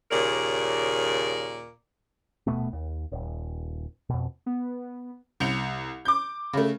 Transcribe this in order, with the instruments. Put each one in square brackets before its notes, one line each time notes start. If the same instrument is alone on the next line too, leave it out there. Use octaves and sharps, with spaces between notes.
[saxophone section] D#2 A#2 C#3 A#4 D5
[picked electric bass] D#1 B2 A3 B3
D#2
D#1
F2 B2
[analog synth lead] B3
[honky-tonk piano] C2 G6 C#7 F7
D6 G6
C#3 A3